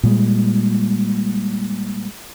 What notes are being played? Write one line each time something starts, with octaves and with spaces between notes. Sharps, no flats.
A#2 G3 G#3